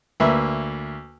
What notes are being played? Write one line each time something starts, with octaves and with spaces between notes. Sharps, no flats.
D2 A#3 B4 E5